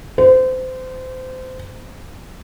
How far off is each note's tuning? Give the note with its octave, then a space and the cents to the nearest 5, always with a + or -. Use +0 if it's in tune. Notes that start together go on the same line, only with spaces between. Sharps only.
C5 -25